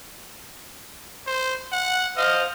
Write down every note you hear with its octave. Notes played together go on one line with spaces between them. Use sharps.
C5
F#5
C5 D#5 F5 F6